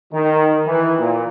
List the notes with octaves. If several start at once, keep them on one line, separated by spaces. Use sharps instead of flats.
D#3
E3
A#2